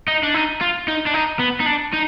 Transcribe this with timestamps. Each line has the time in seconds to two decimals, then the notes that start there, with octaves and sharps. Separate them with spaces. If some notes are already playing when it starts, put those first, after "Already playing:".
0.08 D#4
0.23 D4
0.34 D#4
0.61 F4
0.88 D#4
1.06 D4
1.14 D#4
1.39 B3
1.60 D#4
1.66 D4
1.93 D#4